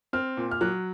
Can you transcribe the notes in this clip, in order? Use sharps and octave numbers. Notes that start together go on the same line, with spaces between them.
C4 F6
A#2
F6
F#3 F#6